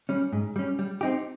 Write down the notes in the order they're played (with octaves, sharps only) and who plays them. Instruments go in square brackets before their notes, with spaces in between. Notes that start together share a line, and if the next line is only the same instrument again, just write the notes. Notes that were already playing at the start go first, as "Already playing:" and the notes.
[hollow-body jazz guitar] G3 C#4
G#2
G3 C#4
G3
C4 D#4 G4